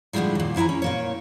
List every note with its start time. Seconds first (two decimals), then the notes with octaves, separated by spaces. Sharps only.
0.13 A2 D3 E3 F3 G3 G#3
0.35 D#2 A#2
0.56 F3 E4 F#5 G#5 A#5
0.69 C#4
0.82 A#2 A#3 C#5